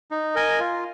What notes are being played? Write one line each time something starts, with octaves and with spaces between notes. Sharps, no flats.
D#4
A#4 D#5 G#5
F4